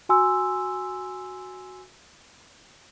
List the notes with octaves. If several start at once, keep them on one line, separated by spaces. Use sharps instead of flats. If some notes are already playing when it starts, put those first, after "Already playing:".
F#4 G#5 C6 E6